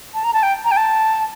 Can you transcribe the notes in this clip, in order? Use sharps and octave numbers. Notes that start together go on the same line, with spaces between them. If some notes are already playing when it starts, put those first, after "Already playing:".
A5
A#5
A5
G5
A#5
G5
A5